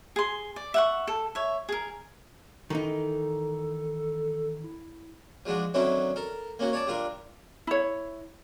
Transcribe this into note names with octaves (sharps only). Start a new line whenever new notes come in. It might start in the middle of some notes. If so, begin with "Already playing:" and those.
G#4 C6
D5
E5 F#5 C#6
A4
C#5 E5
G#4 A#4
D#3 E3 D#4 A4
E4
F3 G#3 D4 F#4
D3 D#3 F#3 C4 C#4 E4
A4 A#4
A#3 C#4 F#4
C#5 D5 A5 D6
G3 D4 F4 A#4
E4 C#5